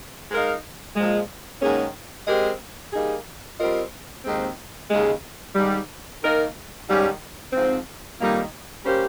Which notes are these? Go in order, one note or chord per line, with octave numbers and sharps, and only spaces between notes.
G#3 D#4 A#4 F5
A#2 F3 G#3
G#2 D#3 A#3 C#4 G#4
G#3 C4 G4 A#4 D#5
G3 A#3 D#4 G#4
G3 C4 F4 A#4 D#5
D#2 D#3 G#3 C4
D#2 C#3 G#3
G#2 D#3 G3
D#3 A#3 D#4 A#4
G#2 D#3 G3 C#4
G#2 F3 C4
F2 D#3 G3 A#3 D#4
G3 A#3 C#4 G4 C5